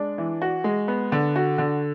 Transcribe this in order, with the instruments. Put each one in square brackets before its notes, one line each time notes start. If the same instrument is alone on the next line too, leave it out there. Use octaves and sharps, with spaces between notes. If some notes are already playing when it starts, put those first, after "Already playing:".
Already playing: [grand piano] G#3 D4
E3
F#4
G#3
B3
D3
F#4
D3